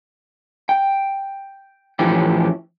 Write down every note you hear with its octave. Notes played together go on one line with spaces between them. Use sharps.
G5
A2 E3 F3 A3 C#4 G4